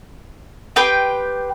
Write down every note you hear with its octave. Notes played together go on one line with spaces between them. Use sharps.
G4 B4 G5 C6